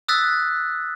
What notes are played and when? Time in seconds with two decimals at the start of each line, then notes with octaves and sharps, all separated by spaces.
0.08 D#6 E6 F#6 A6 B6